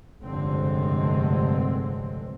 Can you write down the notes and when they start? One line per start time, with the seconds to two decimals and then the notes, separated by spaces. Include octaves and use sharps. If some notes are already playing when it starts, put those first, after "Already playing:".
0.23 F1 C#2 G2 D3 G#3 C4